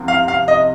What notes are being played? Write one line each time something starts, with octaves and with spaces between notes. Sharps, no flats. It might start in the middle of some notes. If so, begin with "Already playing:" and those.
Already playing: C2 C3 F3 C4
F5
F5
D#5